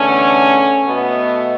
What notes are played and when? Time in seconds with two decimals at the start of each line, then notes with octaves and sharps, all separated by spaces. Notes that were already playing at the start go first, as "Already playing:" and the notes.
Already playing: E2 D3 A3 C#4
0.85 B2 A3 B3